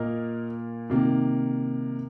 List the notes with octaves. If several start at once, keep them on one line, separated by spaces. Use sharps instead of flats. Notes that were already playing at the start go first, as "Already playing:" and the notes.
Already playing: A#2 A#3 A#4 D#5
C3 D#3 A#3